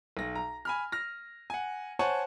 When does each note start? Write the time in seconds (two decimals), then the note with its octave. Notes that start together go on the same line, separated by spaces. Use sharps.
0.17 B1 A#6
0.35 A#5
0.65 G#5 B5 F6
0.92 F6 A#6
1.50 F#5 G#5
1.99 C5 C#5 F#5 G#5 A5 C#6